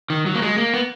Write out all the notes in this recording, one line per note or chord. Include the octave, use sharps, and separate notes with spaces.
D#3
F#3
A#3
G#3
A#3
B3